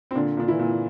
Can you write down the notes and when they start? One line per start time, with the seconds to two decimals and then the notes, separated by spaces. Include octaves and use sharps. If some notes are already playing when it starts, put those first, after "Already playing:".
0.11 C4
0.15 A#2 D3 D4
0.37 A#2 D4
0.48 E3 E4
0.59 A#2